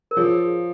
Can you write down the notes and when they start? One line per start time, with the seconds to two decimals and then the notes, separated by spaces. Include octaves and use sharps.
0.11 A#4
0.17 F3 G#4 C#5